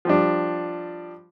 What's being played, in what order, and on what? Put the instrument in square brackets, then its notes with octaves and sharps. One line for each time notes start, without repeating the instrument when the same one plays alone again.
[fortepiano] F3 G3 D4